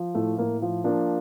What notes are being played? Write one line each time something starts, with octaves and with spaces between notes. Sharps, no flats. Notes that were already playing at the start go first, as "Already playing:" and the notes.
Already playing: F3
A2 A3
A2 A#3
F3
F3 A#3 D4